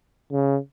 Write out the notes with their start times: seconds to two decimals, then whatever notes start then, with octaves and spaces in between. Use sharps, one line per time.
0.32 C#3